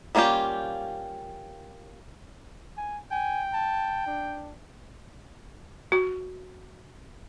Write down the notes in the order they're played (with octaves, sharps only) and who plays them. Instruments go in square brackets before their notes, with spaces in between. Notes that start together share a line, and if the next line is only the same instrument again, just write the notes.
[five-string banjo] G3 A#3 C#4 F4 G4
[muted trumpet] G#5
[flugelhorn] G5 [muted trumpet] G#5
[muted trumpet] A5
D4
[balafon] F#4